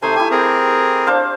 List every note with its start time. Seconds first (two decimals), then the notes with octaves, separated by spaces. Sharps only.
0.02 C3 A3 D#4 A4 C5 G#5
0.16 E4 G4 G#5
0.31 C4 G#4 A#4
1.07 D4 C5 F5